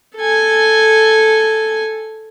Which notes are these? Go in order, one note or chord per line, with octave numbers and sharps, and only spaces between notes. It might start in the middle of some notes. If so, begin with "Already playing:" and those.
A4 G#5